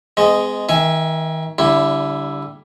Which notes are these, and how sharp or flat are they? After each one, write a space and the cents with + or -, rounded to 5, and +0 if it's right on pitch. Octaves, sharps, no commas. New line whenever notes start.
G#3 +0 C4 -45 D#5 +0
D#3 +35 E5 +0 G#5 +0
D3 -25 G3 +0 E4 +5